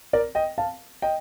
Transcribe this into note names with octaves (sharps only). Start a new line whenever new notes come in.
A#4 D5
D#5 G5
F5 A5
D#5 G5